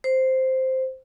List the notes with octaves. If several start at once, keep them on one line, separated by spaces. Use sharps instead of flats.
C5